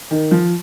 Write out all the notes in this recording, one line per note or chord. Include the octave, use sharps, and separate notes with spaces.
D#3
F3